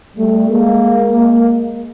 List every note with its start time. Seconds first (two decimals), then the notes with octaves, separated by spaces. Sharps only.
0.17 G3 A3
0.49 G#3 A#3